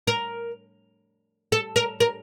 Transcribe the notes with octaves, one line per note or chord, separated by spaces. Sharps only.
A#4
A4
A#4
A#4